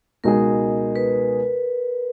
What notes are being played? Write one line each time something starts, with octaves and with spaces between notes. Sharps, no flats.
C#2 B2 G#3 D#4 G#4 A#4
B4